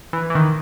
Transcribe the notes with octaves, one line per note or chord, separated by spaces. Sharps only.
E3
E3
D#3